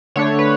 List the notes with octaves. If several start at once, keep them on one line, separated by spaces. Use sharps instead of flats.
D3 A3 D4 C#5
B4